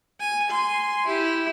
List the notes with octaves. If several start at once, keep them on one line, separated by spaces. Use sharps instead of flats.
G#5
G#5 C6
E4 G4